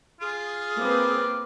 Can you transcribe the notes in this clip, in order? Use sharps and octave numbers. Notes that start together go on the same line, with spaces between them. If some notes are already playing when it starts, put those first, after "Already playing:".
F4 G#4
A#3 C4 B4 D6